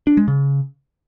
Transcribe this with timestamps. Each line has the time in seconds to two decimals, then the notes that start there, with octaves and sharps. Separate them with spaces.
0.07 D4
0.17 G#3
0.28 C#3